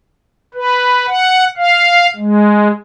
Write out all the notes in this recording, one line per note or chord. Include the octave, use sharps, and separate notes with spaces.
B4
F#5
F5
G#3